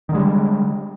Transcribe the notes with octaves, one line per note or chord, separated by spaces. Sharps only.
D3 D#3 G3 G#3